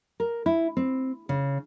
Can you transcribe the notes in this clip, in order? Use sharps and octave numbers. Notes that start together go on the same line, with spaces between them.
A#4
E4
C4
C#3